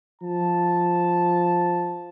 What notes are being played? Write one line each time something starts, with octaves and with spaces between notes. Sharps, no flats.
F3 A5